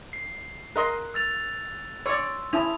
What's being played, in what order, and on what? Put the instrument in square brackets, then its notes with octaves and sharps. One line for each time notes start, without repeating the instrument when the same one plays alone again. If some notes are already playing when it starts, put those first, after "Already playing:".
[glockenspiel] C7
[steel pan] A#4 D#5 C6 [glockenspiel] F#6
[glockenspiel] E6 A6 F7
[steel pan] C#5 D5 [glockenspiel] C6 E6
[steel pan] C#4 E4 [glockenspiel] A5 D#6 F7